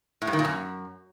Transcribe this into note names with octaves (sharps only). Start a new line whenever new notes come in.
A2
G2
D#3
A#2
F#2